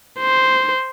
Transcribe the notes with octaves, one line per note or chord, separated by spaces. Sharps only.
C5